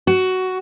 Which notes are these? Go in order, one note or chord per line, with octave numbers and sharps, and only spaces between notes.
F#4